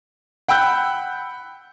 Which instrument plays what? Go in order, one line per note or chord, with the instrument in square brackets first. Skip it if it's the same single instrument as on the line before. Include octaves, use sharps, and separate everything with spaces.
[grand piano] F#5 G5 B5 E6 F#6 G6